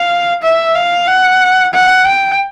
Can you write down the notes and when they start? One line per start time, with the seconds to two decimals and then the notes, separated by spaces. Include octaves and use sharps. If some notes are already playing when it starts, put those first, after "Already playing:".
Already playing: F5
0.43 E5
0.75 F5
1.07 F#5
1.73 F#5
2.05 G5